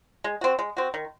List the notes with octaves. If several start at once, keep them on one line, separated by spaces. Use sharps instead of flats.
G#3
C4 F#4
G#3
C4 F#4
D#3